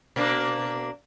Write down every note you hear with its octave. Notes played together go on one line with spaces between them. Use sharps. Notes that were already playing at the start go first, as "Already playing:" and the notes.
B2 A#3 D4